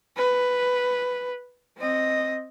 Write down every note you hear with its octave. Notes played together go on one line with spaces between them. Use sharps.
B4
C4 D#5